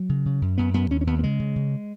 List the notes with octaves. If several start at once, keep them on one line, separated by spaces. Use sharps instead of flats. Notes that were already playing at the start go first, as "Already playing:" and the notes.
Already playing: F#3
C#3
C#3
F#2
F#2 B3
F#2 B3
D#2 C#4
C#4
D#2 B3
B3
C#3 G#3
C#3
C#3